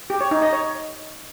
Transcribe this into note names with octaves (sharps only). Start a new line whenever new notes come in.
G4
C#5
D#4
D#5
C#5